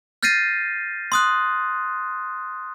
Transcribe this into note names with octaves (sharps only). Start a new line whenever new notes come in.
F6 G6 A6 A#6 C7 D#7
C6 D#6 F#6